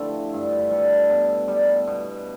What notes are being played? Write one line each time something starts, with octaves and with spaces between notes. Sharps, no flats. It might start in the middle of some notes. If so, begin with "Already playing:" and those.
Already playing: D3 F3 A3 E4 G4 B4
G2
B4
G3 A4
B2
G3
B2